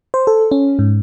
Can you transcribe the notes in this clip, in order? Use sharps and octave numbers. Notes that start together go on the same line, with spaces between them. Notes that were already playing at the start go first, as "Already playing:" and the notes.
C5
A4
C#4
G#2